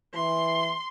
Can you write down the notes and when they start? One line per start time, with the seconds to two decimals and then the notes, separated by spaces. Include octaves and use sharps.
0.14 E3 C6